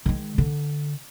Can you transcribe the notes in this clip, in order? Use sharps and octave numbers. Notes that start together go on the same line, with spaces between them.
D#3 G#3
D3